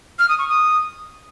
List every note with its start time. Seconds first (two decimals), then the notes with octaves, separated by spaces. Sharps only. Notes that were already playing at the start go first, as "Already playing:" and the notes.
0.19 F6
0.29 D#6
0.39 C#6
0.49 D#6